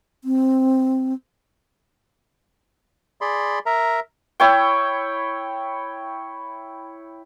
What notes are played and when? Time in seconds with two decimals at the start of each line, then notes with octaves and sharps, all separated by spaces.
0.24 C4
3.21 G#4 D5 B5 C6
3.66 A#4 E5 A#5
4.40 E4 C#5 G5